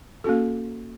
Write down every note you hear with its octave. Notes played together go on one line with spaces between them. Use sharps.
A#3 C#4 F#4 A4